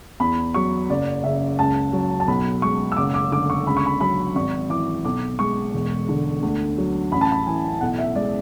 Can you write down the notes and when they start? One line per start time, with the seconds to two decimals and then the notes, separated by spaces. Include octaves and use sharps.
0.20 E2 B5
0.54 F#3 C#6
0.90 F#1 D5
1.24 C#3 E5
1.59 C#2 A5
1.93 F#3
2.20 A5
2.27 B1 B5
2.62 G#3 C#6
2.92 E6
2.97 F#1 D6
3.14 D6
3.32 D3 D6
3.50 C#6
3.67 C#2 B5
3.77 C#6
3.86 B5
4.00 F#3 B5
4.35 G#1 C#6
4.69 E3 D6
5.05 B1 D6
5.39 G#3 C#6
5.74 E1
6.09 D3
6.42 D2
6.78 F#3
7.12 A1 B5
7.21 A5
7.32 B5
7.46 E3 G#5
7.81 B1 F#5
7.99 E5
8.15 G#3 D5